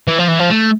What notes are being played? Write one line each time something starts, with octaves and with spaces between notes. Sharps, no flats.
E3
F3
E3
F3
A3